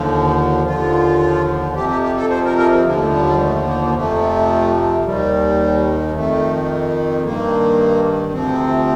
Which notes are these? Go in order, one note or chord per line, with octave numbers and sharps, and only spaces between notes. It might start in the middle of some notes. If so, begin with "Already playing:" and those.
Already playing: D#2 D3 F3
D#2 D3 F3 F4
F2 C3 F3 G4
G4
G4
A4
C5
A#4
A#4
C4
D#2 D3 F3 A#3
A3
G3
G3
A3
A#3
A#3
F2 C3 F3 A3
D#2 D#3 G3
F2 D#3 A3
G2 D#3 A#3
D2 C3 F3 C4